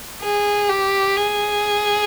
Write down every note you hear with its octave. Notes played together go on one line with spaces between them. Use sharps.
G#4
G4
G#4